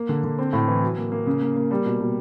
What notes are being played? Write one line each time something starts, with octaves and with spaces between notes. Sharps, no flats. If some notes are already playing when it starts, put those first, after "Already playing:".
Already playing: A#3
D3
D3
C4
A2
E3
F#3
A#3
A#3
C#3
A#3
A#3
G3
B2
B2